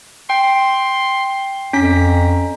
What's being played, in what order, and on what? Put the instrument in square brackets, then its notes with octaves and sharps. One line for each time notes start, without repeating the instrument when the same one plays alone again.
[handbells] G5 [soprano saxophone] C6
[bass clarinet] F2 [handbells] C#4 B6 [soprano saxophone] A#5